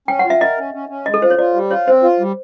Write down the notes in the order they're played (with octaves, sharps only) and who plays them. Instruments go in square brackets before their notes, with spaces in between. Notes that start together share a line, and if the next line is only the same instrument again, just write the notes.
[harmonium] C#4 [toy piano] G5
[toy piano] F#5
[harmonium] F4
[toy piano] E5
[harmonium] A#4 [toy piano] D#5
[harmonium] C#4
C#4
C#4
[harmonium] G#3 [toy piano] D#5
[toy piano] A4
[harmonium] F4 [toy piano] C5
[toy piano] C#5
[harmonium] F4 [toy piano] D5
[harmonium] G3
[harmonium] F4 [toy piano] C#5
[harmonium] C4 [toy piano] C5
[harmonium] F4
G3